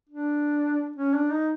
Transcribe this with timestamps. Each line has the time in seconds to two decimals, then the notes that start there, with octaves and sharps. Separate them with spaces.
0.09 D4
0.96 C#4
1.14 D4
1.31 D#4